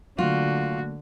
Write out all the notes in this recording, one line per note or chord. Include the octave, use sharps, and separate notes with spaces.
D3 F#3 A3 A#3 F4 F#4